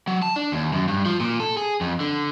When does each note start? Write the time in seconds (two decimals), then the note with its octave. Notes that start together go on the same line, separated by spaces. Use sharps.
0.07 F#3
0.23 A5
0.36 D4
0.52 D#2
0.73 F#2
0.88 G2
1.06 F3
1.20 A#2
1.40 A4
1.57 G#4
1.81 F2
2.00 D3